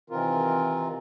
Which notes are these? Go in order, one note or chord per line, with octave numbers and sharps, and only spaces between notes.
C3 D#3 E3 C4 F4 A#4